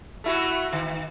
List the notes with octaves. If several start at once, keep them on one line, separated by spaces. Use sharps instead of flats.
A3 E4 F#4
D#3